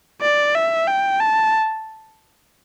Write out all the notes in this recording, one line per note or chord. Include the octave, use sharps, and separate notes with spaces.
D5
E5
G5
A5